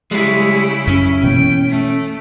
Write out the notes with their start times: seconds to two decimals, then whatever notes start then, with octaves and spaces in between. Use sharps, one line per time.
0.11 C#3 G3 G#3 E4
0.87 F#2 C#4
1.23 B2 E3 A#3 G5
1.70 A3